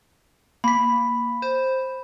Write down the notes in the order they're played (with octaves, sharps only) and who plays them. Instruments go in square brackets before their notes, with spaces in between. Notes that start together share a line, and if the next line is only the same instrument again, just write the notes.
[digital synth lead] A#3 [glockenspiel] B5 B6
[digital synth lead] C5